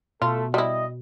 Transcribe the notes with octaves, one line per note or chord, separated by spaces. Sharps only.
B2 A3 F4 A4
G3 E4 D#5